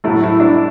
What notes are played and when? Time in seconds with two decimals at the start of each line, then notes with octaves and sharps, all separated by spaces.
0.04 A2 F#3 A3 E4
0.24 E4
0.40 D4
0.44 E4